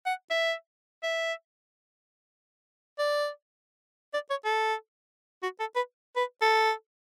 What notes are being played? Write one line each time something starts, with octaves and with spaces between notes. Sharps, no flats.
F#5
E5
E5
D5
D5
C#5
A4
F#4
A4
B4
B4
A4